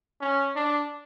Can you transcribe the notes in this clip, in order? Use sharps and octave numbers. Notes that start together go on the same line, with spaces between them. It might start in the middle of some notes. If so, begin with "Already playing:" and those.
C#4
D4